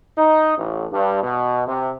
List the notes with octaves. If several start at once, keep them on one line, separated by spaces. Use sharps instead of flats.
D#4
A1
G2
B2
C3